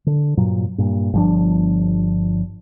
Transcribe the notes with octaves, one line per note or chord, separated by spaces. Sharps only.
D3
G2 A#2 F#3
G2 A#2
G1 F3 D4